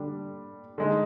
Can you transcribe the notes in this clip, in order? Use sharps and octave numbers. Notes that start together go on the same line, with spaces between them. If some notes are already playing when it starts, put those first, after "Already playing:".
Already playing: D3 G3 D4
D3 G#3 D#4